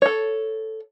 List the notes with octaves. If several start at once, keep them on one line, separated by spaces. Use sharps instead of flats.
A4 C#5